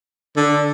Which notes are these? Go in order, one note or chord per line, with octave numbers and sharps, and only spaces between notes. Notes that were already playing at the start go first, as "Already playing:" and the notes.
D3